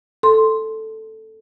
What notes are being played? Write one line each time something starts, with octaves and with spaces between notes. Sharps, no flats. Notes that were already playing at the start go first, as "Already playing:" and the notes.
A4 C6